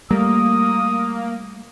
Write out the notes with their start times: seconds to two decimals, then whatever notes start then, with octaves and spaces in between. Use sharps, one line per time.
0.11 G3 A3 A#3 D#6